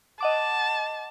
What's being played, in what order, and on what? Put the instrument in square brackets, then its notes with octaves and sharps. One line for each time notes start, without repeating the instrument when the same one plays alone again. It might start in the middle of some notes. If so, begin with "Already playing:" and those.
[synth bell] D#5 F#5 D6 [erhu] A5